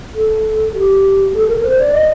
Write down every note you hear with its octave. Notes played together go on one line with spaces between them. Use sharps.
A4
G4
A4
A#4
C5
D5
D#5